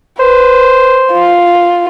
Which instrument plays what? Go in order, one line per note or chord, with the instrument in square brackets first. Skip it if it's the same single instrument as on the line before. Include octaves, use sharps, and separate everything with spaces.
[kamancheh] B4 [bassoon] C5
[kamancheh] F4